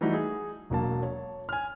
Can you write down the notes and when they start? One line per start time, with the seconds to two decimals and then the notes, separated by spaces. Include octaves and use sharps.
0.01 E3 G3 A3 D#4 E4 F#4
0.14 G#4
0.70 E1 F#3 A#3 A5
1.03 C#5
1.49 G#5 F6